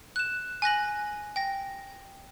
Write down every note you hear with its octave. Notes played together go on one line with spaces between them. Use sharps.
F#6 E7
G#5 F#6 A#6 F#7
G5 A#6